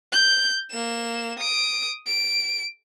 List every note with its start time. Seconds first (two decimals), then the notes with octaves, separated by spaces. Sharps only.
0.12 G6
0.70 A#3 E7
1.39 D#6 D7
2.06 D7